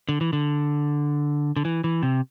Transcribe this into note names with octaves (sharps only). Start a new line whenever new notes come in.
D3
E3
D3
D3
E3
E3
C3